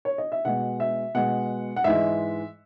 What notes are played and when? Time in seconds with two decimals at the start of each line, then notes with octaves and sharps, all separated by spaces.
0.05 C#5
0.18 D#5
0.32 E5
0.45 B2 G#3 F#5
0.80 E5
1.15 B2 G#3 F#5
1.76 F#5
1.84 G#2 E3 G#3 E5